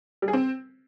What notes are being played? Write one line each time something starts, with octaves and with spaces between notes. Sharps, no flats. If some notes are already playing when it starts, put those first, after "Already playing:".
G3
G#4
C4